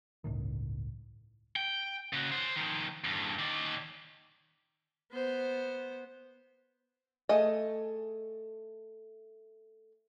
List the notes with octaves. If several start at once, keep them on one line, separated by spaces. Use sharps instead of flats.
G1 C#2 A2 D#3
G5
C#3 F#4
C5 F#5
D#3 F3
E2 G2
D#3 D5
B3 C5
A3 G#4 D#5